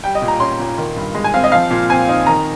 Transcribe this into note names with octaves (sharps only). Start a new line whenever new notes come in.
G3 G5
D#5
A#2
A#5
C#4 C6
A#2
D#3
G2
G#3
G#5
C4 F5
D#5
F3 F5
A#2
C4 G#5
D#4
D#3 A#5